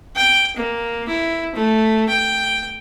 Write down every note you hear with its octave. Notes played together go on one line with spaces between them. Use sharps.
G5
A#3
E4
A3
G5